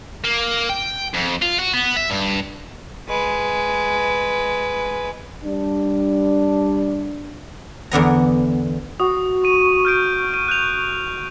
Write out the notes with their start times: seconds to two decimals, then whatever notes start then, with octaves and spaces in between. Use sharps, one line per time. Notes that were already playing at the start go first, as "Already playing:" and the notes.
0.24 A#3
0.69 G5
1.14 F2
1.42 F4
1.59 F#4
1.74 B3
1.97 E5
2.10 G2
3.08 G#3 B4
5.45 G3 D4
7.92 E2 D3 B3 A#5
9.00 F#4 D#6
9.44 C#6 D#7
9.85 F6 G6 D7
10.34 D#7
10.48 F#6 G6 F7